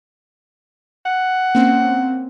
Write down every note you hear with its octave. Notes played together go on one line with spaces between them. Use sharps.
F#5
A#3 C4 C#4